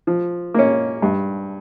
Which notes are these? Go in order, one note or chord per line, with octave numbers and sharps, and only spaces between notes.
F3
A#3 C#4
G2